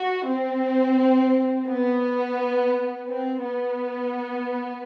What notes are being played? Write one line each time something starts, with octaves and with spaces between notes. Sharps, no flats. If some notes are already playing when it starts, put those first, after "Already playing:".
Already playing: F#4
C4
B3
C4
B3